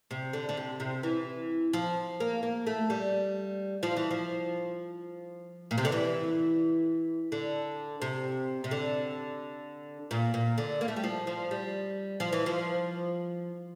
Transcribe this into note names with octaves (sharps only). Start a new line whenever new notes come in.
C3
D3
D3
C3
C3
E3
F3
A#3
A#3
A3
G3
F3
E3
F3
A#2
C3
D3
E3
D3
C3
C3
D3
A#2
A#2
D3
A#3
A3
G3
F3
F3
G3
F3
E3
F3